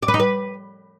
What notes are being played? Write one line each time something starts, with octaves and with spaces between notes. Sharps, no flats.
D5
B4
D#4
B4